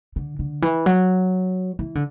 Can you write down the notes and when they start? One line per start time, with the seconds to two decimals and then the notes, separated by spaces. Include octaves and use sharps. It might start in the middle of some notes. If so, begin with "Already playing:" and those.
0.16 D3
0.39 D3
0.62 E3
0.86 F#3
1.79 E3
1.95 D3